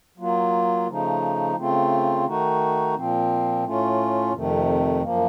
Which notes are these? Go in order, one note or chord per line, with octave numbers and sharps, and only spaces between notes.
F#3 A#3 F4
C#3 F3 A3 D#4
C#3 A3 C4 F4
D#3 A3 D#4 F#4
A#2 F3 C4
A2 A3 C#4 F4
F2 C3 D#3 A3
F#2 F3 A#3